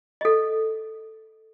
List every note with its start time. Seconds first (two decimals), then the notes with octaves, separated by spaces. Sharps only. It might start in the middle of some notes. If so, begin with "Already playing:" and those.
0.21 A4 D#5